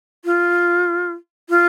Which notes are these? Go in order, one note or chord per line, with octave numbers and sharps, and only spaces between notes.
F4
F4